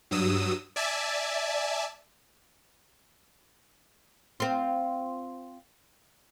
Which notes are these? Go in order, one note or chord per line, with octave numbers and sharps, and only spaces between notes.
G2 F#3 D#6 E6
D5 E5 G#5 A5
C4 F4